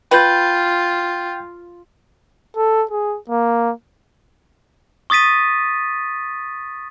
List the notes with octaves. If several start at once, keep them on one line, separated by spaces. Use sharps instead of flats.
F4 B4 G5 G6
A4
G#4
A#3
C#6 D#6 A6 B6 D#7